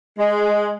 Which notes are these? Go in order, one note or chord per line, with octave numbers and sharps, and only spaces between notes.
G#3